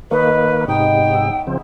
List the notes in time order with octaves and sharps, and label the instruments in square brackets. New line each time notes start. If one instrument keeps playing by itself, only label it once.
[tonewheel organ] D#3 A#3 [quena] B4 [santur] C#5 D#5
[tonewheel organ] G#2 C3 [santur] B3 D#4 [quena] G5
[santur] E5
[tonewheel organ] C#3 F3 C4